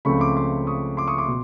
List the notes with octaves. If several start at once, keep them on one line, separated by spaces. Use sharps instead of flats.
C#2 C#3 F3 A3 C4 B5 C#6
C6 D6
C6 D6
C#6 D#6
C6 D6
C#6 D#6
C6 D6
B2